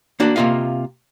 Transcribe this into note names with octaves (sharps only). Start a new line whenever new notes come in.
A#3 D4 F#4
C3 A#3 F4 D#5 F5